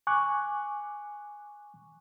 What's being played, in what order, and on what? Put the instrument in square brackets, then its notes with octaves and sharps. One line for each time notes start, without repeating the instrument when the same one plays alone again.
[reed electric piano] G#5 C#6 D6 F#6